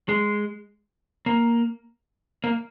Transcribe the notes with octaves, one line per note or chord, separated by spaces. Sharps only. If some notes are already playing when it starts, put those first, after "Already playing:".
G#3
A#3
A#3